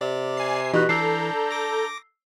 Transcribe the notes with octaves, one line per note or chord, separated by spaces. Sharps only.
C3 D5
G#5 C7
B2 E3 D#4 F#4 G4 F#6
E3 D4 A4 A#5 E6 G6 C7
D6 A#6